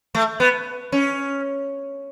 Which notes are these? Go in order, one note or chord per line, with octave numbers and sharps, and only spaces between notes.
A3
B3
C#4